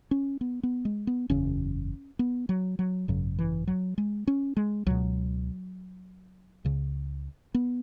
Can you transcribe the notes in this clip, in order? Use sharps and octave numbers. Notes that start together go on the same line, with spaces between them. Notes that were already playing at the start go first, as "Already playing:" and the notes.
C#4
B3
B3
G#3
B3
F#1 E2 C#3 C#4
B3
F#3
F#3
G#1 F#2 C#3 F#3
E3
F#3
G#3
C#4
G#3
C#2 B2 F#3
C#2 C#3
B3